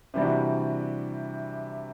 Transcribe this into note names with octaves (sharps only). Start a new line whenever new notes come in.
C3 E3 G3 D4 F#4